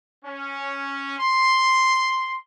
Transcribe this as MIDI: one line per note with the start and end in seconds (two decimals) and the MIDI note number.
0.25 1.16 61
1.19 2.37 84